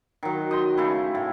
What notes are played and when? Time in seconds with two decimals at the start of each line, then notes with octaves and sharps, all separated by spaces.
0.23 D#3 F#3
0.51 D#5 G5 C6
0.77 C#3 A3 E4
1.15 A2